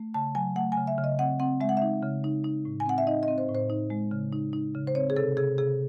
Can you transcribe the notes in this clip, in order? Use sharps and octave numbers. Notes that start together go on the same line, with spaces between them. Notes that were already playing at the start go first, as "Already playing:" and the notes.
Already playing: A3
C#3 A5
F#3 G#5
A3 F#5
C#3 G#5
E5
C#3
D#5
C4 F#5
C4 F#5
G#3 E5
F#5
D#4 E5
C#3
D#4
D#4
A2
G#5
C4 F#5
E5
D#4 D#5
D#5
C4
C5
A2
C5
D#4
G#3
C#3
D#4
D#4
C#3
C5
C4 C#5
G#4
C3 A4
C3 G#4
C3 G#4